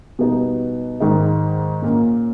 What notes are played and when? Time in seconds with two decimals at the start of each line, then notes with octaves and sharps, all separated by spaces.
0.19 B2 G3 B3 D#4
1.00 G#2 D#3 G#3 D#4
1.82 A#2 A#3 C#4